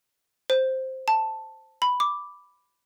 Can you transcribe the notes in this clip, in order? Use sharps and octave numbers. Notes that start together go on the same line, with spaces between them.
C5
A5
B5
D6